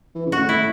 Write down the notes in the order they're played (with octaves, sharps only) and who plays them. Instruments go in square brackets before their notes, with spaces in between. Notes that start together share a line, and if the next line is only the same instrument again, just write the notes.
[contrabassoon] E3
C#3
[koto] F#4
[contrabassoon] A2
[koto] E4